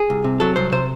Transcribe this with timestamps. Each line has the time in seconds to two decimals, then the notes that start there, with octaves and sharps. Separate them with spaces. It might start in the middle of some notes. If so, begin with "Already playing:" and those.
Already playing: G#4
0.10 C2
0.24 C3
0.40 F#3 A4
0.56 C2 C5
0.72 C3 C5